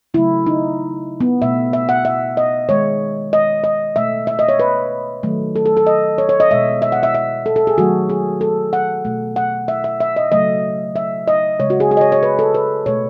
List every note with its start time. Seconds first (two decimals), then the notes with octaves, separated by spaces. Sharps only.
0.14 C#3 F#3 A3 E4
0.46 D#4
1.20 B3
1.42 B2 A3 E5
1.73 E5
1.89 F#5
2.05 E5
2.37 D#5
2.69 D#3 G#3 C#5
3.33 D#5
3.64 D#5
3.96 B2 A3 E5
4.27 E5
4.39 D#5
4.49 C#5
4.59 B4
5.23 D#3 F#3 A3
5.56 A4
5.66 A4
5.77 A4
5.87 D#5
6.18 C#5
6.29 C#5
6.40 D#5
6.51 B2 G#3 E5
6.82 E5
6.92 F#5
7.03 E5
7.15 E5
7.46 A4
7.56 A4
7.67 G#4
7.77 D#3 F#3 A3 F#4
8.09 G#4
8.41 A4
8.73 F#5
9.05 B2 A3
9.36 F#5
9.68 E5
9.84 E5
10.00 E5
10.16 D#5
10.32 C#3 F#3 A3 D#5
10.96 E5
11.28 D#5
11.60 C#3 G#3 C#5
11.70 F#4
11.80 G#4
11.91 G#4
11.97 D#5
12.01 C#5
12.12 C#5
12.23 B4
12.39 A4
12.54 B4
12.86 B2 A3 C#5